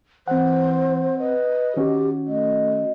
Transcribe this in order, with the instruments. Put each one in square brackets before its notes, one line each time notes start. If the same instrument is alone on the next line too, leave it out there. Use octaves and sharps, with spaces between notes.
[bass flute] E3 [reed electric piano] C4 F#5 [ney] C5
[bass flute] B4 [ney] D#5
[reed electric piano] D#3 C#4 F#4 [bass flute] G4
[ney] A3 [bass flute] D#5